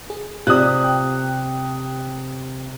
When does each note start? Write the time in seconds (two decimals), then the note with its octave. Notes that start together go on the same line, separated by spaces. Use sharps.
0.10 G#4
0.47 C3 F4 D5 D#6 F#6
0.84 G5